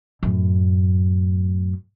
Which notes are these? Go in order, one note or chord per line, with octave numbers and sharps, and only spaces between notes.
F#2 A2